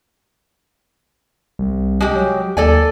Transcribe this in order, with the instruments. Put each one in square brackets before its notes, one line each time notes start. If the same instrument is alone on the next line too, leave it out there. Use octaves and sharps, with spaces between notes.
[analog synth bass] C2
[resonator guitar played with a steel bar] G#3 G4
[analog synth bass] F#3
[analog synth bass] D#2 [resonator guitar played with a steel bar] A4 D5 G#5